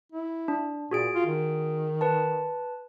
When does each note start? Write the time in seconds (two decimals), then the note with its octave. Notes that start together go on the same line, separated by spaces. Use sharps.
0.12 E4
0.48 D4
0.91 A#2 F#4 G#4 D7
1.15 F4
1.26 D#3
2.01 B4 A5